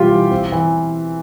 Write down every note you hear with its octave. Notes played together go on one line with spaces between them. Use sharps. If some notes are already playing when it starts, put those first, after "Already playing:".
Already playing: B2 E3 G3 C4 F4 G4
E3
C4
E3